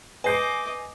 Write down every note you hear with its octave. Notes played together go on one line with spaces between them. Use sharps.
B4 D#5 G#5 D6 G6 C7